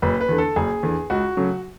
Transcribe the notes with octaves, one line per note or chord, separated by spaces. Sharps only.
F#1 B4
B4
E2 D3
A4
F#1 G#4
E2 D3
C#2 F#4
C#3 F#3 A3